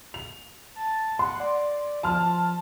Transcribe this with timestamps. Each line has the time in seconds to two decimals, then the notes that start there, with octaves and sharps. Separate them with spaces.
0.14 F7
0.76 A5
1.19 F#5 C6
1.40 D5
2.03 F3 A5 C6 F6